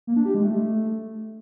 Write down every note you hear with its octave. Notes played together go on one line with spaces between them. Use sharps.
A#3
D4
G4
G#3
A3